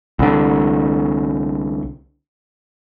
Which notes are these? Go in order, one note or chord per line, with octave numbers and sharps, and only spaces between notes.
C2 D3